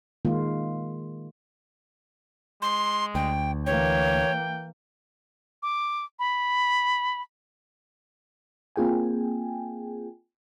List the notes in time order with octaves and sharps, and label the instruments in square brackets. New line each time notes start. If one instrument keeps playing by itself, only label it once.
[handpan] D#3 G#3 A#3 F4
[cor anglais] G#3 [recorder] C6
[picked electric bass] D2 [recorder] G5
[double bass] E3 A#3 [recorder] C#5 [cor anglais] G5
[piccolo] D6
B5
[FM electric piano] A#3 C4 F4 G#4 G5 G#5